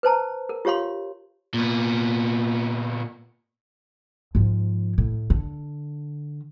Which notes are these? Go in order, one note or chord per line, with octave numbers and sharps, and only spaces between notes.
B4 C5 A5 A#5
A#4
F4 G4 C#5 F5 C6
A#2 B3
G#2 F3
A2
D3